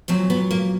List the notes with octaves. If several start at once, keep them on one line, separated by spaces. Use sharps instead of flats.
A#2 F#3 C4
B3
A#3